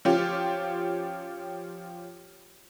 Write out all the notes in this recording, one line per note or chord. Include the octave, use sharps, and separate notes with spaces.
F3 C#4 F4 G4